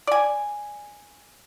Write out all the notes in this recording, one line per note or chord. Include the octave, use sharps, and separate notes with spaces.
D5 G#5